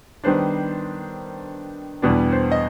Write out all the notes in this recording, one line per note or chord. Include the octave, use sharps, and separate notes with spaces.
D#3 G3 B3 D4 C5
E2 B2 G3 B3 D4
C5
D#5